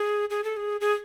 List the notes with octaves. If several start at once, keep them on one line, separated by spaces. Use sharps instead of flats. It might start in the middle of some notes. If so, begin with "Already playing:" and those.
Already playing: G#4
G#4
A4
G#4
G#4